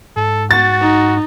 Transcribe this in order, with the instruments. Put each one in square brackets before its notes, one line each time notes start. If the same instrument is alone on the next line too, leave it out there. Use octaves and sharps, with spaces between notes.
[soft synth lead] G#2 [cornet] A4
[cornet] F#4 [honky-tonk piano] A6
[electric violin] D#4